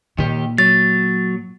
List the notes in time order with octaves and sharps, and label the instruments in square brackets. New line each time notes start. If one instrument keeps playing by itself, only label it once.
[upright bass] A#2 [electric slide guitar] D#3 G4
[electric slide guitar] F#3 [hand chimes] A6